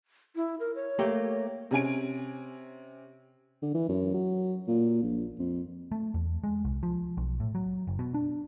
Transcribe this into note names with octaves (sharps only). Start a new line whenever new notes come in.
E4
A#4
C#5
A3 A#3 G4
C3 C#4 G#5 D7
D3
E3
F#2
F#3
A#2
A#1
F2
A3
E2
G#3
C2
F3
B1
A2
F#3
F#1
B2
D4